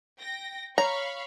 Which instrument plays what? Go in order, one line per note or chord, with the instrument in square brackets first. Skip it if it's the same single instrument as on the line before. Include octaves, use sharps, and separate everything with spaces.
[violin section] G5 A#6
[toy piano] C#5 [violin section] F5 B5 C#6 [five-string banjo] A#5